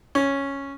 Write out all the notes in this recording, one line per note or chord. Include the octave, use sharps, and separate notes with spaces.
C#4